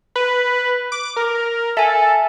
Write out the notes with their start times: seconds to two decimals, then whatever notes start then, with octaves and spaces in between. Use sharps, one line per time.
0.16 B4
0.92 D6
1.16 A#4
1.77 A4 E5 G#5